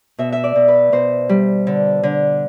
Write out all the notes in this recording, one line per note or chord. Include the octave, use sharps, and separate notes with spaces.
B2 E5
E5
D5
B2
B4
B2 C5
G3
D3
D3